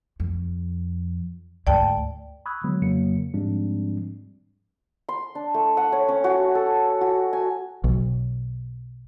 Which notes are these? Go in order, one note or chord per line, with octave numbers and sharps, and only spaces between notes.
F2
D2 G#2 D5 G5 A5
B5 C#6 D#6 E6 F#6 G#6
D3 F#3 G#3 B3
F2 C#3 F#3 A#3 C#7
G#2 F3 G3 G#3 C4 D4
C6
D4
A3
F#5
C#5
C#4
F#4
A4
F#4
G#5
B1